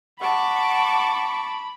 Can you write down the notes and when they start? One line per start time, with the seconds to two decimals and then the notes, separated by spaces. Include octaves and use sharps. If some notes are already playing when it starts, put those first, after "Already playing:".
0.21 F#5 A5 B5 C#6 D6